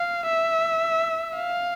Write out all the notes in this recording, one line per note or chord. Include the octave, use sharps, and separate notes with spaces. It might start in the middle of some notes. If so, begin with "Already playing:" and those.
Already playing: F5
E5
F5